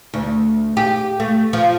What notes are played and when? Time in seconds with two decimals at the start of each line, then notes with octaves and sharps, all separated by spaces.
0.14 D2
0.77 G4
1.20 A3
1.53 F3